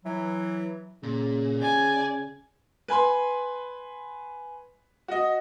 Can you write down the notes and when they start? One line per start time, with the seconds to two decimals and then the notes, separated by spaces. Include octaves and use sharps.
0.05 E3 F#3
1.03 A#2 C#3
1.61 D5 G#5
2.88 B4 G#5 B5 C6
5.08 F#4 D#5